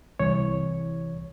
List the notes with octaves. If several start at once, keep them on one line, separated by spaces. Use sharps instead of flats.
C2 E3 C#5